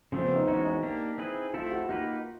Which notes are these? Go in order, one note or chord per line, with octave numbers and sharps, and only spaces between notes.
C#3 F3 A3 C4 D4 G4
B3
D#4
E3 G#3 C#4 D#4 F#4
D#4
A#3 D4 G4
C4 E4 G#4 B4
A3 C4 E4 F4 A4
F#4
A#3 D#4 F#4 G4 B4